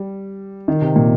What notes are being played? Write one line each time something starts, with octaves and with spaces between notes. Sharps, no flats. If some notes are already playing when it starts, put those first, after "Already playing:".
Already playing: G3
D#3
C3
A#2